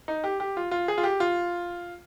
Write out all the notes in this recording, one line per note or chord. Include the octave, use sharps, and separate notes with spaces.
D#4
G4
G4
F4
F4
G#4
F4
G4
F4